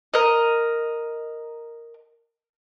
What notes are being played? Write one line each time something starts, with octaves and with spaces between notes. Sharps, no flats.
A#4 D#5